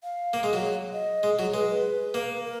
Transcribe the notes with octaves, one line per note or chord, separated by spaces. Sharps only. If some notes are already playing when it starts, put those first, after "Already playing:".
F5
A#3
G#3
F#3
D#5
G#3
F#3
G#3 B4
B4
A#3
A#4